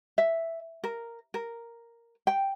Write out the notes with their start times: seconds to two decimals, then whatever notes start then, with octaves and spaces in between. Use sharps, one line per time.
0.18 E5
0.84 A#4
1.34 A#4
2.27 G5